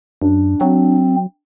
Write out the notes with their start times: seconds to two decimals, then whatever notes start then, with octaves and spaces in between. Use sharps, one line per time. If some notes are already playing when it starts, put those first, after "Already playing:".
0.22 F#2 D4
0.61 F#3 C4